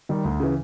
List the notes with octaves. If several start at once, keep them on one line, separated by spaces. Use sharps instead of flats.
D#3 G3
D2
C#3 E3